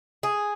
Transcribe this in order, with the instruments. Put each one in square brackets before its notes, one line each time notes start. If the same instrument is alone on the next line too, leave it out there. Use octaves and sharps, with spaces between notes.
[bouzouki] G#4